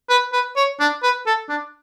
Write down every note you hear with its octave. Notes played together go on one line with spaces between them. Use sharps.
B4
B4
C#5
D4
B4
A4
D4